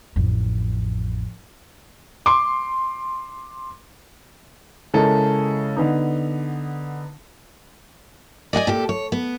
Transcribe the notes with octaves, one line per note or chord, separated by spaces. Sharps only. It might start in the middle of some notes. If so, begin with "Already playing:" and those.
A1 F2
C6 D6
C#3 G#3 E4 A4 A#4
D3 B3 D#4
D5 D#5 F#5 G#5
A#2 G4 A4
C#5
B3